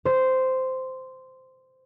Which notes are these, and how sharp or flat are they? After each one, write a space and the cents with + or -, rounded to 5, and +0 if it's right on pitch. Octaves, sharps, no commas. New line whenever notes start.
C5 -10